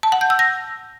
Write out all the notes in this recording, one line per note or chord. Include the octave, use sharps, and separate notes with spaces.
A5
F#5
G6
E6
A#6